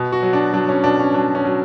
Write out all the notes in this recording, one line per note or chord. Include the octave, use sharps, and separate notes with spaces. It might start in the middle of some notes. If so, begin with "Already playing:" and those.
Already playing: B2
F#4
F#3
D4
F#3 D4
C#4
B2 D4
C#4
F#3 D4
C#4
F#3